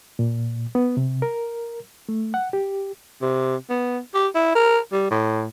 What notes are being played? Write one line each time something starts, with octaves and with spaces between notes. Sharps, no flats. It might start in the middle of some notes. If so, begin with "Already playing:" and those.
A#2
B3
C3
A#4
A3
F#5
G4
C3
B3
G4
E4
A#4
G3
A2